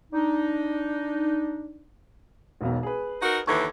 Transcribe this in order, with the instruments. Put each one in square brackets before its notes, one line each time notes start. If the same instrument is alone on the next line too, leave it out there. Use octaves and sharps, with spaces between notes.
[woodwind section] D4 D#4
[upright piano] E1 B1 B2
G#4 B4
[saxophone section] D#4 F#4 A#4
[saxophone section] D#2 D3 E3 [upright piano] C#6 G#6